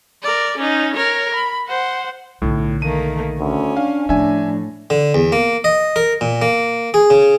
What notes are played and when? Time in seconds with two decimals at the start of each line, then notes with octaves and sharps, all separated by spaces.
0.23 A#4 D5
0.58 C#4 D#4
0.95 A#4 C#5
1.35 B5
1.68 C5 F#5
2.42 B1 A2 D3
2.82 D#3 A3 A#3 D#7
3.39 D2 C#4
3.77 D4 F5
4.09 A2 F3 D4 E5 G#5
4.90 D3
5.14 E2
5.32 A#3
5.64 D#5
5.96 A#4
6.21 A#2
6.42 A#3
6.94 G#4
7.10 C#3